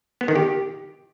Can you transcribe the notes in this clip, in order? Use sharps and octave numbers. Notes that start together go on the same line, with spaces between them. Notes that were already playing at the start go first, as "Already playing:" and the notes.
B3
D#3
G4